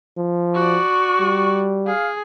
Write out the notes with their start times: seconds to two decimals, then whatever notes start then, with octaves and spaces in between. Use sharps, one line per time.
0.17 F3
0.54 F#4 D5 C#6
1.20 G3
1.86 G#4 F5